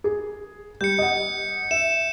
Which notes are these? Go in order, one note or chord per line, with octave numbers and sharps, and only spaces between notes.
G#4
G3 G6 C#7
D#5 F#5
E5 E7